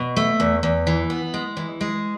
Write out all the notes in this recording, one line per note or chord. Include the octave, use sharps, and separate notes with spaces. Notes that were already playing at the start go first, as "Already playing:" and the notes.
Already playing: B2
A3
E2
E2
E3
B3
G#3
E3
G#3